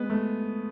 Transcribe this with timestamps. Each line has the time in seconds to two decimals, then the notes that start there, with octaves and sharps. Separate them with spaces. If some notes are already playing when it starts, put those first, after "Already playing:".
Already playing: G#3 B3
0.10 A3